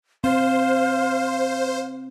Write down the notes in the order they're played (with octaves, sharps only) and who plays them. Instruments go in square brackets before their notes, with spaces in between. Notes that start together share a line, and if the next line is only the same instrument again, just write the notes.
[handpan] C4 [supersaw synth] C5 [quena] F5